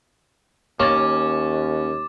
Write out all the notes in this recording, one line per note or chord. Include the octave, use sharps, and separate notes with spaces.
D#2 A#3 C#4 D6 A6